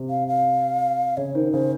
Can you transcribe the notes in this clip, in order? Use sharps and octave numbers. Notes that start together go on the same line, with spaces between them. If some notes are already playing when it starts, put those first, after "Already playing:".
Already playing: C3
F5
F5
C#3 C#5
D#3 C5
C#3 C5